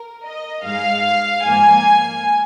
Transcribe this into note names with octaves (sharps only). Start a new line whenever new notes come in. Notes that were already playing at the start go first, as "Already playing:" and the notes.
Already playing: A#4
D#5
G#2 G#3 F5
G#2 F3 A#3 G#5